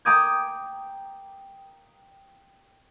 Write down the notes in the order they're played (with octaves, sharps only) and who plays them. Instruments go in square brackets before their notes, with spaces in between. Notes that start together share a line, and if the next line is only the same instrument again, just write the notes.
[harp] G5 A#5 D6 D#6 G6 G#6